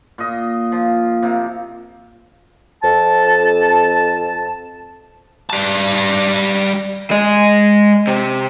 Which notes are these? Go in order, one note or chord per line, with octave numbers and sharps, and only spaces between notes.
A#2 D#5
F3
C3 A#3
F2 A5
G3 A5
G#3 D#5
C3